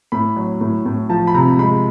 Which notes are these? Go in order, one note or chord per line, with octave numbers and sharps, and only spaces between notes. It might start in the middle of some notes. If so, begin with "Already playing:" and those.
A2 B5
F#3
A2
A2
F3 A5
B5
C3 A#5
G#3 B5